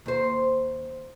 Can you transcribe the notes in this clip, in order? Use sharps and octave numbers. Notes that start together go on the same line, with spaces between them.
D#2 C5